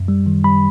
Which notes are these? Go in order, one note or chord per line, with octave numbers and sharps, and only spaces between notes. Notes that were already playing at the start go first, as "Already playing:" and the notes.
Already playing: F#2
G3
D#3
G3 B5